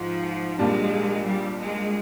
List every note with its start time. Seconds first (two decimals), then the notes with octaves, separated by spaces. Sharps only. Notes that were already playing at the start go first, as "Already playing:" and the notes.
Already playing: G#2 F3
0.59 A#1 A#2 G3 G#3 D4
1.26 G3
1.59 G#3